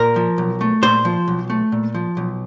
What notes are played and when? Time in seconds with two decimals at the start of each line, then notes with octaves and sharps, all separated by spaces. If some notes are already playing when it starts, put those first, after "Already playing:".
Already playing: A#2 A#4
0.16 F3
0.38 B1
0.61 A3
0.82 A#2 C5
1.05 F3
1.28 B1
1.50 A3
1.72 A#2
1.94 F3
2.17 B1